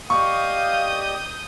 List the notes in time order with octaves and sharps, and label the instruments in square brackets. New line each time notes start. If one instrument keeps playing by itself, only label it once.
[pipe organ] G4 D5 D#5 [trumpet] F5 [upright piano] C#6 [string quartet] D#6 G6